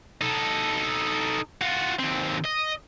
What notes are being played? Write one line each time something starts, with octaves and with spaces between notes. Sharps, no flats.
D#4 A4
F4 F#4
D#2 C4
D#5